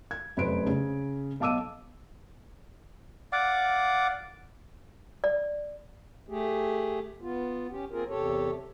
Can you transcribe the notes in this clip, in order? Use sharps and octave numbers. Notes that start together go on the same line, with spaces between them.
G#6
F1 F#2 B4 C5 D7
C#3
B1 F5 A5 D6 E6 D#7
D5 F5 F#5 D6
D5
A3 G4 G#4
B3 F4
C#4 G4
A#3 C4 F4 G#4 A#4
E2 C3 G4 A4 C#5